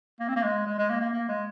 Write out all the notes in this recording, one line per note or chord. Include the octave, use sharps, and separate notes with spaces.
A#3
C4
A#3
G#3
G#3
G#3
A#3
A#3
A#3
G#3